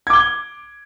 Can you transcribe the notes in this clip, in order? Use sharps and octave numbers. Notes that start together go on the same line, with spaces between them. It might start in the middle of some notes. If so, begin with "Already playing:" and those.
D6 G#6 G7